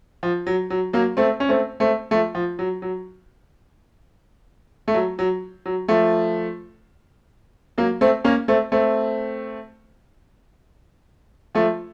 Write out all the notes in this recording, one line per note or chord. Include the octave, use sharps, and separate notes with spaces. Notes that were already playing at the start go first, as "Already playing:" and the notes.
F3
F#3
F#3
F#3 A#3
A3 C4
C#4
A3 C4
A3 C4
F3 A3
F3
F#3
F#3
A3
F#3
F#3
F#3
F3 A3
F#3 A#3
A3 C4
A#3 C#4
A3 C4
A3 C4
F3 A3